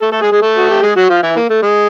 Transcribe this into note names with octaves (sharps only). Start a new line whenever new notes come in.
A3 A4
A3 A4
G#3 G#4
G#3 G#4
A3 A4
F#4
G4
G#3 G#4
F#3 F#4
F3 F4
E3 E4
A#3
A3
G#3